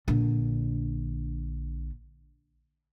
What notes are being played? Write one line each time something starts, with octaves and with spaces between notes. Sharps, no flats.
A#1 D3